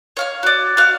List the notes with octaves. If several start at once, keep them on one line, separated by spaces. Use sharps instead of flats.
C#5 F5 F6
F#4 D5
F#4 F5